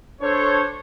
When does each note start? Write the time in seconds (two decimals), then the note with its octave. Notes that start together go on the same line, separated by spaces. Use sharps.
0.21 D4 A4 C5 C#5